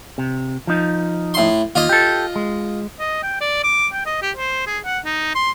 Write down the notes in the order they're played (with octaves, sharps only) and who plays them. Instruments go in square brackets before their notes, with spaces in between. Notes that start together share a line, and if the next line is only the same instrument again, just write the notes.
[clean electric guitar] C3
F3 D#4
[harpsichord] A2 C6
[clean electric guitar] D#2 [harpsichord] F4 D#5
[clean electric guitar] G4 A4
G#3
[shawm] D#5
G5
D5
D6
G5
D#5
G4
C5
G#4
F#5
D#4
C6